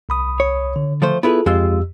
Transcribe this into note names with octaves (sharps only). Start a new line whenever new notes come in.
C2 B5 D#6
C#5
D3
F3 A3 C5
B3 E4 F4 G#4 A4 B4
F2 G#3 F4 G4 E6